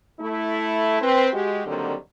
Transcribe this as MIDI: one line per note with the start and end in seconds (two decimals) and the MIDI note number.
0.20 1.01 57
0.20 1.01 64
1.01 1.28 60
1.01 1.28 71
1.32 1.66 56
1.32 1.66 66
1.32 1.66 67
1.67 1.94 50
1.67 1.94 51
1.67 1.94 54
1.67 1.94 55
1.67 1.94 58
1.67 1.94 60